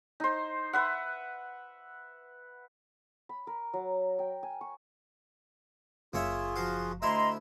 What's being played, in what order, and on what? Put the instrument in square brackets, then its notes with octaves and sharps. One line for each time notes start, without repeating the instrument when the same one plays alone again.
[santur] D#4 C5
B4 E5 F#5
B5
A#4
F#3
G5
G#5
C#6
[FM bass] F#1 [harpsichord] A#3 C#5 E5 [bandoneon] F4 G#4
[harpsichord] F3 F#4 F5
[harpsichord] D2 E4 E5 [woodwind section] D#5 A#5 C6